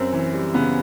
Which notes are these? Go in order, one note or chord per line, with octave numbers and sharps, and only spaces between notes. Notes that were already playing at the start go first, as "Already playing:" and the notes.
Already playing: F#2 C4
E3
G3
C#3 B3